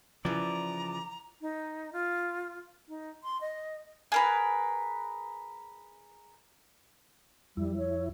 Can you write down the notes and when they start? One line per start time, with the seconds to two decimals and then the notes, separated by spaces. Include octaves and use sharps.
0.25 C#3 E3 F3 D5 A#5
1.41 D#4
1.93 F4
2.88 D#4
3.23 C6
3.41 D#5
4.12 G#4 A#4 B4
7.57 F2 G3 E4
7.77 C#5